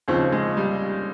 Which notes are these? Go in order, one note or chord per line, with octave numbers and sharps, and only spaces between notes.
D#2 C#3 F3 C4
G#3
G3